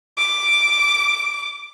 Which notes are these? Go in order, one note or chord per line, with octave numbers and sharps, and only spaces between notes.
D6